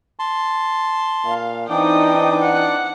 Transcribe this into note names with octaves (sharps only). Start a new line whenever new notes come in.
A5 C6
A#2 F5
E3 C4 D4 D#4 D5 G5 D#6
F#5